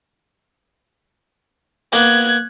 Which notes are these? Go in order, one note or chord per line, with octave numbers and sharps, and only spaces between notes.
A#3 B3 F#6 G#6